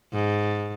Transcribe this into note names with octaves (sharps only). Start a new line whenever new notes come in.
G#2